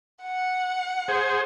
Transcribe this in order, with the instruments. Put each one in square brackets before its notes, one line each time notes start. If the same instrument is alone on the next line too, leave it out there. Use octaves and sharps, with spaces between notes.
[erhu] F#5
[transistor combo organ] G#4 C5